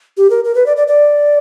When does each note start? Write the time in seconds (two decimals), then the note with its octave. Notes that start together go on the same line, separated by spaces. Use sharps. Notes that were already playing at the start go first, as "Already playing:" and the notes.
0.17 G4
0.30 A#4
0.44 A#4
0.55 B4
0.66 D5
0.77 D5
0.88 D5